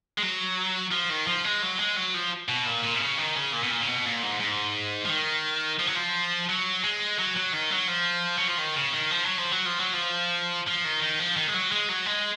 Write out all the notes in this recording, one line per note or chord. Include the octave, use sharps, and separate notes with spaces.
G#3
F#3
F3
D#3
F3
G#3
F#3
G#3
F#3
F3
B2
A#2
A#2
B2
C#3
D#3
C#3
A#2
B2
A#2
C#3
B2
A#2
G#2
G#2
F3
D#3
F3
F#3
F3
F#3
G#3
F#3
F#3
D#3
F#3
F3
F#3
F3
D#3
C#3
D#3
F3
F#3
F3
F#3
F3
F#3
F3
F3
D#3
D#3
F3
D#3
G#3
F#3
G#3
F#3
G#3